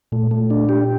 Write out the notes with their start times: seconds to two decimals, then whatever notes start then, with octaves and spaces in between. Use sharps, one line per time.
0.12 A#2 A3
0.31 A3
0.50 D4
0.69 G4